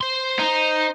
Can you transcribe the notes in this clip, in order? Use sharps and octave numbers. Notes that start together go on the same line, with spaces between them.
C5 C6
D#4